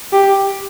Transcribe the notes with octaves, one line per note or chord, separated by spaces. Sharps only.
G4